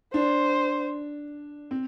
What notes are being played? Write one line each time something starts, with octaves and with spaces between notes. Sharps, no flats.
D4 C5
C4